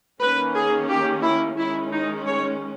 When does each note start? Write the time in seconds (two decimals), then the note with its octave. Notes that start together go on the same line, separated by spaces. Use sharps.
0.21 D#3 A#3 C#4 B4
0.55 G#4
0.89 G4
1.23 E4
1.58 D#3 G#3 C#4 E4
1.92 D#4
2.26 C#5